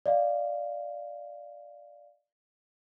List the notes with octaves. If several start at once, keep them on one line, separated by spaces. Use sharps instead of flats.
D5 D#5 F5